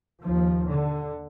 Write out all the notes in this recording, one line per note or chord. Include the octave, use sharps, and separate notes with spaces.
D#2 F3
D3